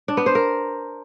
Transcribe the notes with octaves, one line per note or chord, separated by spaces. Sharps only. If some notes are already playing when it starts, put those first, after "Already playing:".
D4
B3
C5
A#4